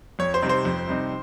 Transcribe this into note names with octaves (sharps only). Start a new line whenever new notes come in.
F2 C#5
C5
C3 G3 C4 D#4
C5
F2
C3 G3 C4 D#4